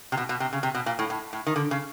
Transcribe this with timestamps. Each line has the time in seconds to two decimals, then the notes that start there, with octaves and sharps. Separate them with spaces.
0.12 C3
0.17 B2
0.29 B2
0.40 C3
0.53 C#3
0.63 C3
0.75 B2
0.86 A#2
0.99 A2
1.10 A2
1.33 A2
1.47 D#3
1.56 D3
1.71 C#3